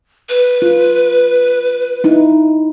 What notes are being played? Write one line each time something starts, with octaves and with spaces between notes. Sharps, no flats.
B4
F4
D#4 E4